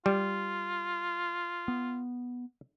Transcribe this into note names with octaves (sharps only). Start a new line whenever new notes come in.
G3 F4
B3